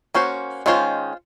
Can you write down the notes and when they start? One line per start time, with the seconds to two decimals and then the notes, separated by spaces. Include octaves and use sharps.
0.14 A#3 C#4 F#4 C5
0.66 D#3 G#3 C#4 F4 C5